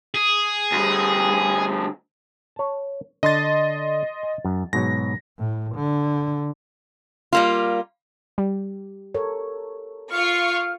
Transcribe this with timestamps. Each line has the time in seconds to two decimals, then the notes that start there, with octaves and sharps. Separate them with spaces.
0.14 G#4
0.72 D2 G3
2.56 C#5 A5
3.23 D3 D4 D#5 C6 A6
4.23 G#5
4.45 F#2
4.73 G#2 B2 F#3 A#6
5.39 A2
5.75 D3
7.33 G3 A#3 F4
8.38 G3 G4
9.14 A4 A#4 C#5
10.11 F4 F5 C#6 F6